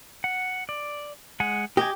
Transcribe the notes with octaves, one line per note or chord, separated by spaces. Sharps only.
F#5
D5
G#3 F#5 G#5
G4 D#5 G#5